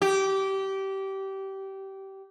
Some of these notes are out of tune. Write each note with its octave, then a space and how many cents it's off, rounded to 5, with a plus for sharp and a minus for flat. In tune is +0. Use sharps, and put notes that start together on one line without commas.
G4 -20